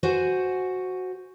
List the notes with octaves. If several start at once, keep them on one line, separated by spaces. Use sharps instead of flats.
F#4 C5 F#5 G#5